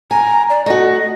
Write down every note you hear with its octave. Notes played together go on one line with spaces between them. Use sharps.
G#5 A#5
D5
A3 F#4 D#5